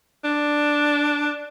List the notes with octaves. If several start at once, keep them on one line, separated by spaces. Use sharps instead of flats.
D4